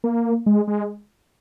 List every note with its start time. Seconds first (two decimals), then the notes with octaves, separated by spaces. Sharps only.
0.04 A#3
0.46 G#3
0.68 G#3